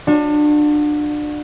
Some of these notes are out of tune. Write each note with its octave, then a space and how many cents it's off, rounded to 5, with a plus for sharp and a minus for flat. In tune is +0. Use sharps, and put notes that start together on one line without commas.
D4 +25 F#4 -35